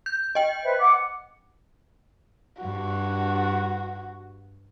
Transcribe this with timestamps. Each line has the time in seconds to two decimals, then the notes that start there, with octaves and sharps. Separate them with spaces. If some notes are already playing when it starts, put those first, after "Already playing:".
0.06 G6
0.35 D#5 G5
0.63 B4 C5 E5
0.79 F#5 D6
2.60 G2 F#4